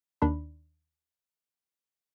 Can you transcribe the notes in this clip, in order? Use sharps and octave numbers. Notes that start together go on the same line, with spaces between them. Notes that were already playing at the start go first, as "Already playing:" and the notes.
D#2 D#3 D4 B5